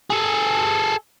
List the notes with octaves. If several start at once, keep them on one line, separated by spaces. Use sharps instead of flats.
G#4 A4